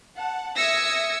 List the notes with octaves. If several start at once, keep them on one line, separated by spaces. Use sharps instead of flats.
F#5 A5
E5 D#6 E6 G#6 A#6 C#7